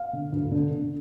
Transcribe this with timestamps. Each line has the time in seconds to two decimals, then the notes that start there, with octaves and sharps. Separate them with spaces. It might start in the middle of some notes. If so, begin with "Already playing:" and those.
Already playing: F5
0.13 D3
0.32 D2
0.51 D3
0.71 D3